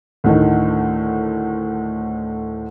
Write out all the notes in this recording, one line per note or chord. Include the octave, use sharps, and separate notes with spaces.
D2 A2 D#3